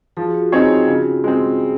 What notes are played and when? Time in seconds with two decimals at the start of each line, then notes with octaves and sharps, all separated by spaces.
0.17 F3 G#4
0.24 F#4
0.31 F4
0.38 F#4
0.52 C4 D#4 G#4 C#5
0.88 C#3
1.24 G#3 C4
1.59 G#4